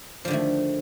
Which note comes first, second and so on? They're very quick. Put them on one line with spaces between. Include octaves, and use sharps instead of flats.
F3 D3 D#3 A3